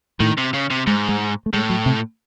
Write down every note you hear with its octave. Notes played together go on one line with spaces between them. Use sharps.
A2 D#3
C3
C#3
C3
G#2 G#3
G#3
A3
A2 G#3
F#3
C3